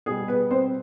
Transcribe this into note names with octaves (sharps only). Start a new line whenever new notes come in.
B2 G3 G#4
B3 B4
C4 C5